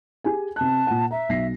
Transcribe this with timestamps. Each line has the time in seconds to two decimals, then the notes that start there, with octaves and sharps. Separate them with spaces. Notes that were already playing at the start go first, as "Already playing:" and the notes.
0.24 G4 G#4 G#5
0.56 C3 A5 F#6
0.87 A#2 F#5
1.11 E5 A#5
1.29 B1 A#6 C7